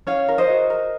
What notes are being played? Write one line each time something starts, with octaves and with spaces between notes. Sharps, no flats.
C#4 C#5 F5
A#4
C5 D#5
F#4
A#4